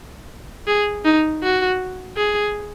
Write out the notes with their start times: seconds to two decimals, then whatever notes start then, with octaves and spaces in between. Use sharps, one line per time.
0.67 G#4
1.05 D#4
1.43 F#4
2.17 G#4